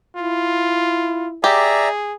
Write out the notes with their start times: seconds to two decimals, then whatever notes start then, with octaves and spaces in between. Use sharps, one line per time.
0.16 E4 F4
1.44 G4 G#4 D5 E5 A#5